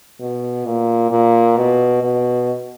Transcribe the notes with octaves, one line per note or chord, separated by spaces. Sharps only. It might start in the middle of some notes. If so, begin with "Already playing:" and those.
B2
A#2
A#2
B2
B2